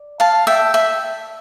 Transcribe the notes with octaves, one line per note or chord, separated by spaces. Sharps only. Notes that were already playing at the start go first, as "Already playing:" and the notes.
Already playing: D5
F5 A5
E5 G5
E5